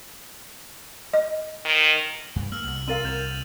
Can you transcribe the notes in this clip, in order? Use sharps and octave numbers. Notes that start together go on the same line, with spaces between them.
D#5
D#3
G2
A#3 E6 F6 F#7
C2 F#7
C4 A#4 F5 A6 D#7 F#7
C2 A#3 G6 E7 F7